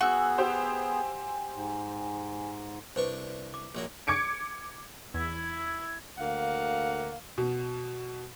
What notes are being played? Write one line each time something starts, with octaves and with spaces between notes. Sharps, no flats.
B3 F#4 G#4 G#5 E6 F#6
G4 C5
G#2
C2 D4 B4 C5 C#6
D6
A#1 F#3 A#3
D6 G#6 C#7 D7
E2 E4 E5 G#6
D2 A#3 F5 F#5
B2